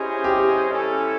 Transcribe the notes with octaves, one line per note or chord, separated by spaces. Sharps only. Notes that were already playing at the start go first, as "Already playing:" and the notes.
Already playing: C#4 E4 G4 G#4 C5 D#5
G4
C#4 E4 A4